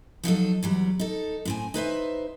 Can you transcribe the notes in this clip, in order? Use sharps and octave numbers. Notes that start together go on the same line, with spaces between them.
F3 F#3 D#4 A4
E2 F#3 G3
D#4 A4
A2 C4 G#5
D#4 B4 C5 E5